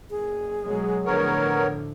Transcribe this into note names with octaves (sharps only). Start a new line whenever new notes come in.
F#1 G#4
B2 F#3 G#3
A2 D3 F3 B3 A#4 C#5